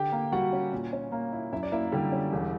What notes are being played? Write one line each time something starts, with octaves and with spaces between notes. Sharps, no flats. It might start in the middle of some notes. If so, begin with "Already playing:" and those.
Already playing: D3 G4 G5
A#3
G3 F#4 F#5
C#4
A#2
C#4
A#3
E4
F#2 E4 E5
D5
A#3 E4 E5
D3 G3 G4
C#4
E1